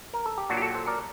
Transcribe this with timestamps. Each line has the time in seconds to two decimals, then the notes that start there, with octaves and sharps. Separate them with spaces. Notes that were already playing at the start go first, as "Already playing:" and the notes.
0.13 A#4
0.26 A4
0.38 G4
0.49 A#2 F#3 D4 F#4
0.57 G4
0.62 F#4 A4
0.74 A4 C5
0.87 A#4 D5